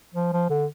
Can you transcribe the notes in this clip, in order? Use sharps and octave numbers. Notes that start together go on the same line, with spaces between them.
F3
F3
D3